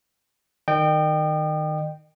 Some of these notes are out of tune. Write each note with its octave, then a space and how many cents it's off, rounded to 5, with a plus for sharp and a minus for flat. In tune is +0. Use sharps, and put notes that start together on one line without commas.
D#3 -10 D#5 -40 G5 -5